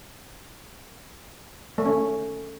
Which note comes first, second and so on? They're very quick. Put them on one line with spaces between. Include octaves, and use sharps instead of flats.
A3 D#3 C#4